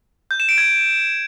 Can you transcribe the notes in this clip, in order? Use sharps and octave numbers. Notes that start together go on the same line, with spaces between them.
G6
E7
D7
G#6